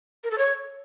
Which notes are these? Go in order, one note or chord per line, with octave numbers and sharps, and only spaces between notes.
A#4
A4
C#5